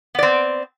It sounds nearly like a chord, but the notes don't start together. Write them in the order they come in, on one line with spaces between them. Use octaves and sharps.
B3 D5 C4